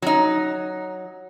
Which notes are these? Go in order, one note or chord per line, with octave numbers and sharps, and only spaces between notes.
F#3 D#4